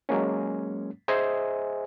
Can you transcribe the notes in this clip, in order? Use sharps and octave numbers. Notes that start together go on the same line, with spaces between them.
F#3 G#3 A#3 C#4
G#4 C5 D#5 E5 G#5